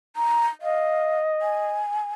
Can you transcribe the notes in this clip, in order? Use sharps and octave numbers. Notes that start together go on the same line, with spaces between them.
A#5
D#5 F5
G#5